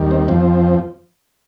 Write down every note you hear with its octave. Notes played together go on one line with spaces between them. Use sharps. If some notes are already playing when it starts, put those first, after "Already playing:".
Already playing: D#2 D#3 G3
C4
F2 F3 C4